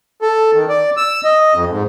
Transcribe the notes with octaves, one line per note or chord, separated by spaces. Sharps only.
A4
D#3
D5
E6
D#5
F2
G#2